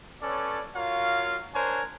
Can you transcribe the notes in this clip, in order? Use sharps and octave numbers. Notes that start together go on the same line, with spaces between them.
C#4 A4 B4 C#5 D5
F4 F#4 A#4 C#5 F5
D4 A#4 C5 C#5 G#5